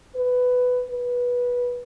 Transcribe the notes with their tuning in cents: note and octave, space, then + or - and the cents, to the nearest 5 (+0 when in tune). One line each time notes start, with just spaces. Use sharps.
B4 +10
B4 -15